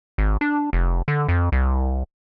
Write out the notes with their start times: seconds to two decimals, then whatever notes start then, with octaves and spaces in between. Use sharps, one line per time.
0.18 G#1
0.41 D4
0.73 F1
1.08 D3
1.28 F2
1.52 C2